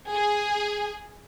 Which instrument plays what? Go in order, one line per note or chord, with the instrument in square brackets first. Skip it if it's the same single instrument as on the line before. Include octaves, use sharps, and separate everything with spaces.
[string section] G#4